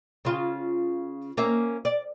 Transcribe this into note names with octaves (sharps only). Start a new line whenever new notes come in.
C#3 F4
A#3 C#4 E5
D5